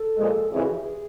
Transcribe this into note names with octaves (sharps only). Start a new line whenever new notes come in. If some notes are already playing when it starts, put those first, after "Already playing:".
Already playing: A4
A#2 F3 G#3
F2 C#3 E3 G#4
F#4
G4
G#4